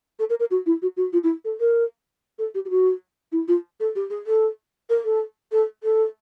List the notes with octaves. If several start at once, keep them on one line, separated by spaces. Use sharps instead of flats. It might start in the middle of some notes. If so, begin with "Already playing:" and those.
A4
A#4
A#4
F#4
E4
F#4
F#4
F4
E4
A4
A#4
A4
G4
G4
F#4
E4
F4
A4
G4
G#4
A4
A#4
A4
A4
A4